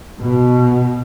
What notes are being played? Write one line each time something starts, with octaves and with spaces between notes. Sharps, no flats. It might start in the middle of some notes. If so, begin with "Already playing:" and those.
B2